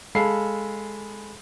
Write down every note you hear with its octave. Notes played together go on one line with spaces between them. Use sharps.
G#3 A4 F5 B5 C7